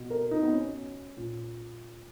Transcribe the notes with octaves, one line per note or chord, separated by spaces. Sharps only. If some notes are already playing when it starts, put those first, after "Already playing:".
Already playing: B2
A#4
D#4
B3
C#4
A#2